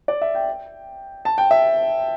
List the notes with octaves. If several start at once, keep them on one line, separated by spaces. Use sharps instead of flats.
D5
E5
G5
A5
G5
E5